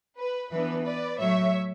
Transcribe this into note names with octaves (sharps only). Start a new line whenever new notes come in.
B4
E3 B3 D4 B4
B4 D5
A2 F#3 A3 C#5 E5